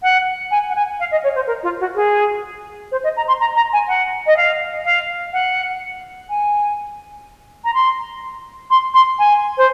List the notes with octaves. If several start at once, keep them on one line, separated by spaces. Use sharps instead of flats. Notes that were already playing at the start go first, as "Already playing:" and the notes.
F#5
G#5
F#5
G#5
F5
D#5
C#5
C5
A#4
F4
F#4
G#4
C5
D#5
A#5
C6
A#5
A#5
G#5
F#5
D#5
F5
F5
F#5
G#5
A#5
C6
C6
C6
G#5
C5